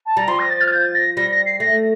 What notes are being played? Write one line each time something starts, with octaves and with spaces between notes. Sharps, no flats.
A5
G3 A#5
F3 C6
A#6
A6
F6
A6
G6
A6
A#6
G3 A#6
A#6
C7
A3 A#6